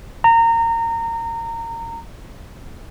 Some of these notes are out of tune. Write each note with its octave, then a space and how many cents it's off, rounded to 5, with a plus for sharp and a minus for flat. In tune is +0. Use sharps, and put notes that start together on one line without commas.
A#5 -25